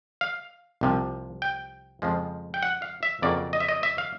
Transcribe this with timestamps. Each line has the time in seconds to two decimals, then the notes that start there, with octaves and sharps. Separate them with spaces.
0.21 F5
0.81 C2 C3 F3
1.42 G5
2.02 F2 C#3 F3 G#3
2.54 G5
2.63 F#5
2.82 F5
3.03 E5
3.22 F2 C#3 F#3 A#3 D5
3.53 D#5
3.60 E5
3.68 D#5
3.83 E5
3.98 F5